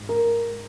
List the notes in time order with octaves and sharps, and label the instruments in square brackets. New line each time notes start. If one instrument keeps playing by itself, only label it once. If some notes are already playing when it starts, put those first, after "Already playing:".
Already playing: [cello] G#2
[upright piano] A#4
[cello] G#2